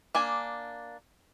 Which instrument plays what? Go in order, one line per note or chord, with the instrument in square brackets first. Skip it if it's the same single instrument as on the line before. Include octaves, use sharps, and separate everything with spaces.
[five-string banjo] A#3 D4 G#5